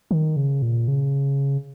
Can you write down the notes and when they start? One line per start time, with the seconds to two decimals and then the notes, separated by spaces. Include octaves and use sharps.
0.11 D#3
0.36 C#3
0.62 A#2
0.88 C#3